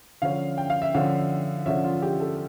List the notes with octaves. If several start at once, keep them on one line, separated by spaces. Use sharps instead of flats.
D3 F3 C#4 F5
G5
F5
E5
D3 F3 C#4 F5
D3 F3 C#4 E5
F4
G4
A4